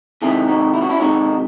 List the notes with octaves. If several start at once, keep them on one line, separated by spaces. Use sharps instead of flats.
C3 D#3 G#3 E4 G#4
D#4 F#4
E4
F#4
C#4 E4
C3 D#3 G#3 D#4 F#4